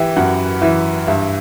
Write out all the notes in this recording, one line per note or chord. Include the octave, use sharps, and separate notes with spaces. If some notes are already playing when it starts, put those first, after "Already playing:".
Already playing: E3 G4 B4 E5 G5 B5
F#2 F#4 F#5
E3 E5
G2 E5